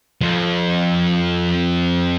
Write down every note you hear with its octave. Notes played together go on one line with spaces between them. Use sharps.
F2 F3